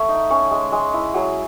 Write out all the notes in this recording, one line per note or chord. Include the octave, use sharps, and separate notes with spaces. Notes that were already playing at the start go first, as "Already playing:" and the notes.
Already playing: A3 C#5 E5 F#5
D#4
C#4 C#5
G#3
G#3
E4
F#3 G#4